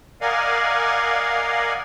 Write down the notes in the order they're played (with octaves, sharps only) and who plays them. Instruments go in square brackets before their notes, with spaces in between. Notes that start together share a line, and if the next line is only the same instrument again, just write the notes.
[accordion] A#4 D5 D#5 F5 F#5 G#5